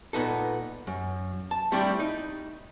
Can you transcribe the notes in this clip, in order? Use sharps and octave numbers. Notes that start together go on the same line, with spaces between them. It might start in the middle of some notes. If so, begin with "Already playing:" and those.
A#2 B3 D#4 A4
F#2
A5
G3 A3 C4 D4 E4 G4
D#4